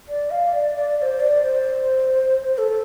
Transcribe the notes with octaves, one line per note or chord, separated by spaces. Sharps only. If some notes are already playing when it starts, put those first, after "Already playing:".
D5
F5
D5
D5
D5
C5
D5
C5
C5
A4